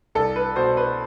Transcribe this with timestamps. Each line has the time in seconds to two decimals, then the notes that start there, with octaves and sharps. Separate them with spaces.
0.15 C2 A4
0.36 B4
0.56 B2 C5
0.77 B4